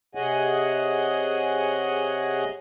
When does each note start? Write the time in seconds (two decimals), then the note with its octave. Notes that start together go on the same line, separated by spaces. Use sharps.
0.15 C3 G#4 C#5 D#5 F#5 G#5